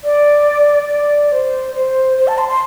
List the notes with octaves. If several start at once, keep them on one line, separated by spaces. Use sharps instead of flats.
D5
D5
C5
C5
C5
A5
C6
C6